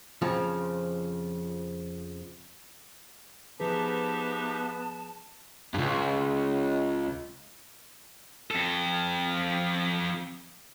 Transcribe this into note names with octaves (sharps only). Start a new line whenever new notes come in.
F2 C#3 F3
F3 B3 D#4 G4 G#4 B4 E5 A5
C#2 G2
F2 A4